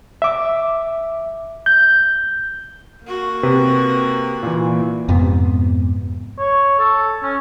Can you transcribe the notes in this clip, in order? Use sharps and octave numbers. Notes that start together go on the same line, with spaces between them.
E5 D6
G6
A#3 F#4
C3 B4
A#2 E3
F2 G#2 C3 B3
C#5
A4
C#4